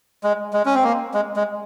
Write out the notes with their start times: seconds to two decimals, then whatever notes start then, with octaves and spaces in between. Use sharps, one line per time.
0.24 G#3
0.53 G#3
0.66 C#4
0.75 C4
0.83 A#3
1.14 G#3
1.36 G#3